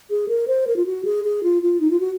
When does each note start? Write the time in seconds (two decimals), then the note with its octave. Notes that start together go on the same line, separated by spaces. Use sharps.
0.10 G#4
0.28 A#4
0.47 C5
0.67 A#4
0.76 F4
0.86 F#4
1.05 G#4
1.24 G#4
1.43 F4
1.62 F4
1.80 D#4
1.90 F4
2.00 F#4